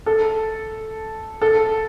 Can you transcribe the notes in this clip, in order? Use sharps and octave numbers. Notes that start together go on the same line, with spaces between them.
A4
A4